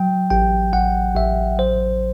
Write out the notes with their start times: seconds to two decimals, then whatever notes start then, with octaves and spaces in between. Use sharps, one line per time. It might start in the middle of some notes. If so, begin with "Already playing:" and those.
Already playing: F#3 G5
0.30 A1 G5
0.73 A1 F#5
1.15 A1 E5
1.58 F#3 C5